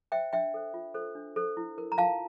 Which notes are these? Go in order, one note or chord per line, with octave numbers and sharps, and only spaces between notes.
C5 E5 G5
D4 E5 G5
A4 C5
F4
A4 C5
D4
A4 C5
E4
A#4
A#5
F4 F5 A5